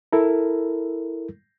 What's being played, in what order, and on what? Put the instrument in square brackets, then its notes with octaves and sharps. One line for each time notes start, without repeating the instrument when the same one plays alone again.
[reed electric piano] E4 A4 A#4